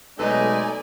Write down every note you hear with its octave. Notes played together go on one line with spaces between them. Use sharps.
B1 G#3 A3 D#4 A4 B4 D5 G#5